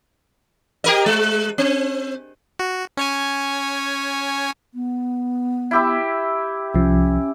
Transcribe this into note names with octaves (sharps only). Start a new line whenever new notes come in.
G4 A#4 D#5
G#3
C4
F#4
C#4 C#5 G#5
B3
E4 G4 E5
C2 F3 C#4